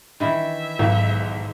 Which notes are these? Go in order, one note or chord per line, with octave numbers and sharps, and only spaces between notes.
D#3 E3 E4 E5
B1 G#2